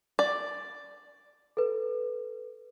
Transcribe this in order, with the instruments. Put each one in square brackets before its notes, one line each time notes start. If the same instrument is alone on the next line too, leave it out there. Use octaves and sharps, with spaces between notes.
[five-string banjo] D5
[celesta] A4 B4